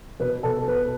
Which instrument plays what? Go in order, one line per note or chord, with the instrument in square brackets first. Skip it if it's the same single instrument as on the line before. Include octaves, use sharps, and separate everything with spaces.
[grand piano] B2 B4
B2 A4
A4
B2 B4